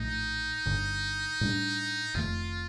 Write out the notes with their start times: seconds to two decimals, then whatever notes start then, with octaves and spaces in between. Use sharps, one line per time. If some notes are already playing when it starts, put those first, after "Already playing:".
Already playing: A#1 A2 A3 D#4
0.66 G1 G2 D3
1.41 A2 G3 D4
2.14 F1 F2 D#3 A3 F4